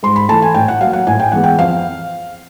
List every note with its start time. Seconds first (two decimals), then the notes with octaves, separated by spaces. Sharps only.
0.03 G#2 C6
0.16 B5
0.29 E3 A3 A5
0.42 G#5
0.54 A2 G5
0.68 F#5
0.81 F#3 A#3 F5
0.93 F#5
1.07 A2 G#5
1.20 G5
1.32 E3 G#3 B3 F#5
1.44 G5
1.59 F2 F5